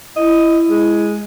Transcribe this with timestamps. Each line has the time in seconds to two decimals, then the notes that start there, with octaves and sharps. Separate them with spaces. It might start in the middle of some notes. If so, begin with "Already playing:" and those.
0.16 E4 D#5
0.70 G#3